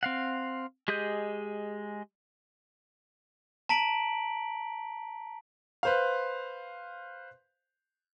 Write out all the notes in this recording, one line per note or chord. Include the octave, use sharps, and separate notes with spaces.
C4 F5 F#5
G#3 G4 G#4 D#5 G6
A5 A#5 B6 D7 F#7
B4 C5 F5